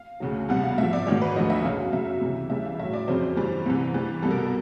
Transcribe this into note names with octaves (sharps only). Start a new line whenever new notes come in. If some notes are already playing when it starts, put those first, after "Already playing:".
Already playing: F5
D2 C#3 F#3
C2 B2 G3 F#5
F5
G#2 F3 E5
D5
G#2 D#3 F#3 C#5
B4
D2 D3 F3 D#5
E5
F#2 C#3 F#3 F5
F#2 C#3 F#3 E5
C#2 C3 E3
C#2 C#3 E3 G3 E5
F5
A2 F#3 E5
D5
F2 C#3 F#3 C5
G2 E3 G3
C2 C3 E3
G2 E3 G3
C2 B2 G3 A4
A#4
A4